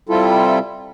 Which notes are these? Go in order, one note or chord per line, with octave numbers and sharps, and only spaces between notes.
C3 G3 C4 E4 F4 A4